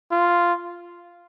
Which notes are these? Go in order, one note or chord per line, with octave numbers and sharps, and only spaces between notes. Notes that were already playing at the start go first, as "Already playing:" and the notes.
F4